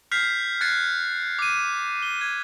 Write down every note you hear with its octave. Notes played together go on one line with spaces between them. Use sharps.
F6 G6 B6 C7 F7
F#6 G#6 A6 C7 C#7
D6 D#7
G7
G#6